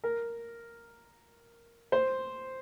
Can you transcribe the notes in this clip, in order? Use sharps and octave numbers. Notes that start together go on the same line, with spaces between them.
A#4
C5